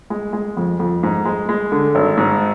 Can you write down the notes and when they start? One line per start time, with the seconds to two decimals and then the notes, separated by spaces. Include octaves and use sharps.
0.10 G#3
0.33 G#3
0.57 F2
0.80 F2
1.03 G#2
1.25 G#3
1.49 G#3
1.72 D3
1.95 G#1
2.17 G#2